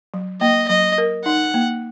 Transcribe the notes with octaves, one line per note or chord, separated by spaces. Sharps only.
F#3
A#3 D#5
F#3 D#5
A#4
D#4 F#5
A#3